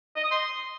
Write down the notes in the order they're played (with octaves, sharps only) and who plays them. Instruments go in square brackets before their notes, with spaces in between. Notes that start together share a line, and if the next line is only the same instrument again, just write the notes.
[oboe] D#5
D#6
C6